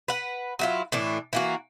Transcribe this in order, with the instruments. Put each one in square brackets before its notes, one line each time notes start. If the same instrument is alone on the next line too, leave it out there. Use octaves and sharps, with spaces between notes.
[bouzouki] B4 F#5
F#3 E4 F4
A2 E3 D4
E3 A#3 F#4